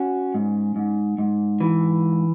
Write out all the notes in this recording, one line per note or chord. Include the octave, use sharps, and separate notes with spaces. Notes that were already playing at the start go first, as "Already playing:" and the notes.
Already playing: C#4 F#4
G#2
G#2
G#2
E3